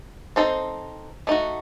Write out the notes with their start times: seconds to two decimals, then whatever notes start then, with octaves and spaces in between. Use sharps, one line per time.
0.36 C4 D#4 A4 C5
1.27 A3 D#4 F#4